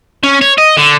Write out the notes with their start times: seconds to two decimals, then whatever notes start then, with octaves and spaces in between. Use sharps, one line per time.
0.24 C#4
0.41 C#5
0.58 D#5
0.77 D3